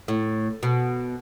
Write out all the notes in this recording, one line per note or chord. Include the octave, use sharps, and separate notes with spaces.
A2
B2